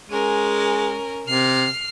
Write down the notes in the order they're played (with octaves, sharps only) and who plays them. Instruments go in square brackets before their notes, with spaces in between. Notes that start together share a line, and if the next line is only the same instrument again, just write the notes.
[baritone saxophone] G#3 [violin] C#4 A#4
[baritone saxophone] C3 [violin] F6 C7